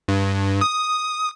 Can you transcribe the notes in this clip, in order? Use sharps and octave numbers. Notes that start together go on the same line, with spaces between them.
G2
D#6